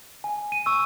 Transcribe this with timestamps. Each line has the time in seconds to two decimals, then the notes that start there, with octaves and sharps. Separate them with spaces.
0.24 G#5
0.52 D#7
0.66 C#6 E6